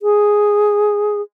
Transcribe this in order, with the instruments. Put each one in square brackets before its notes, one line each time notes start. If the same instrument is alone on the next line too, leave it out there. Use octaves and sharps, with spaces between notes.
[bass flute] G#4